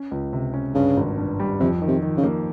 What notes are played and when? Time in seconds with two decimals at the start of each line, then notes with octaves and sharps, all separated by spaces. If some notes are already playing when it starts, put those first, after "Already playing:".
Already playing: C#4
0.11 C#2
0.33 C3
0.54 C#4
0.75 G2 C#3
0.97 G#1
1.18 G2
1.40 G3
1.60 F2 C3
1.82 D#3
1.88 C3
2.02 D#3
2.18 C#3
2.24 A#3